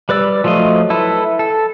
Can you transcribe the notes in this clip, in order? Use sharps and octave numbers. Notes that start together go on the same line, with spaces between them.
G3 B4 D5 E6
F3 F#3 A3 F4 D#5
E4 A4 B4
A4